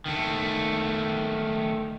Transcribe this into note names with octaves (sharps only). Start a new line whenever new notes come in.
D#3 A3